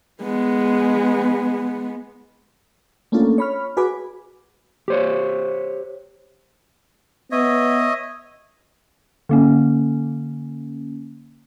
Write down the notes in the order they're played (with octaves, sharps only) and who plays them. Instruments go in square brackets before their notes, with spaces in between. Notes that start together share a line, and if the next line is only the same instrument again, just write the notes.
[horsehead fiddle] G#3 B3
[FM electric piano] A3 A#3 C#4 D4 F4 A4
C#5 B5 F6
F#4 G#4 B4 G#5 B5 D6
[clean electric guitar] G4 C5 C#5
[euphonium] B3 [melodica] C#5 E5 [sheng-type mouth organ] D#5
[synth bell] D3 A#3 C#4